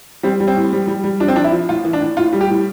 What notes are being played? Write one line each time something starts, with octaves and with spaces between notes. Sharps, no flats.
G3 C4
G3
C4
A2
G3
G3
G3
F3 D4
C4
F3 D4
E4
F3
A2 F4
E3
D4
A2
A2 F4
G3
G4
A2